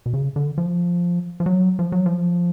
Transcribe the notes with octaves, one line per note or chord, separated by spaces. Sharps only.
B2
C#3
D3
F3
F3
F#3
F3
F#3
F3